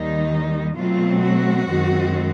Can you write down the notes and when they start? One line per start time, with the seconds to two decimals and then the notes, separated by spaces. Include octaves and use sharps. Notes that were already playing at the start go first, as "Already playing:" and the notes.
Already playing: D#2 D#3 G3 D#4
0.75 B2 F#3 A3 C4 F4
1.21 F#4
1.68 F#2 D#3 G#3 C4